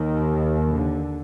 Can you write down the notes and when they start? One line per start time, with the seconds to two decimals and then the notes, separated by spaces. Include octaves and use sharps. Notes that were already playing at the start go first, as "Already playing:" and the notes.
Already playing: D#2 D#3
0.70 D3